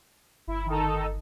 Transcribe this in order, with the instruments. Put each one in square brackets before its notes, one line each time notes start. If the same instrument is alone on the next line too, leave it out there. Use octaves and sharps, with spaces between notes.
[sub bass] G1 [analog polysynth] E4
[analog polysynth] D#3 D#4 A4